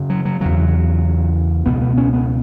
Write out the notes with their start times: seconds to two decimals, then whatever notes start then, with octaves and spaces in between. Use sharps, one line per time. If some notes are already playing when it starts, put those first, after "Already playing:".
Already playing: F#2 C#3
0.10 F#3
0.25 F#3
0.40 E2 C#3 F#3
1.66 C#2 B2 B3
1.81 B3
1.98 C#4
2.13 B3